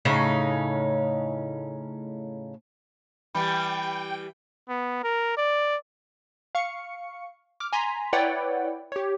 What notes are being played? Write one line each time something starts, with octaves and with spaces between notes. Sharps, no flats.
A2 C#3 C#4 D#4
E3 G3 G5 B5
B3
A#4
D5
F5 C#6 C#7
D6 F6
G#5 A#5 C6 B6
E4 B4 C#5 D5 F#5 G5
G4 C#5